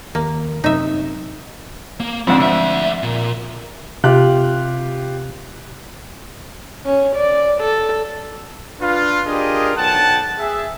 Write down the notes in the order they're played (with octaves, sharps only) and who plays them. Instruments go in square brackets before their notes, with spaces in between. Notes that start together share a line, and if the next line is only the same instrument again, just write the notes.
[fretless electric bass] D#2 [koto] A#3
[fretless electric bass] F#2 C3 [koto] D#4 E5
[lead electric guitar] A#3
[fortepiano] F2 G#2 D3 [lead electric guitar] C4
[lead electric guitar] D2 E5
A#2
[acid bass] C3 [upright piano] F4 G4 F#6
[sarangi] C#4
D5
A4
[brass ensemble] D4 F4 B4
D4 F4 G4 G#4 A#4 D#5
B1 F#5 G5 A5
G#4 E5